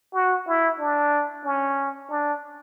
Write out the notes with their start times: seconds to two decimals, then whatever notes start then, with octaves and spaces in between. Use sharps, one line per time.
0.14 F#4
0.47 E4
0.79 D4
1.45 C#4
2.10 D4